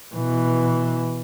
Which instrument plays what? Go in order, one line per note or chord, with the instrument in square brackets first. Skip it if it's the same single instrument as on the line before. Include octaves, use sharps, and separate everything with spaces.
[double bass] B2 E3